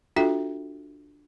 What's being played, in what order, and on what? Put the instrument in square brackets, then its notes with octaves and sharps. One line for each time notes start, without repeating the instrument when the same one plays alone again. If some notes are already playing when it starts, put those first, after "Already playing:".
[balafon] D4 F4 F#4 A4 E5 G5